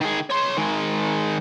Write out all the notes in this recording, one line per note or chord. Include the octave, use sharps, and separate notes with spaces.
D#3 G#4
C#5 C6
D#3 G#3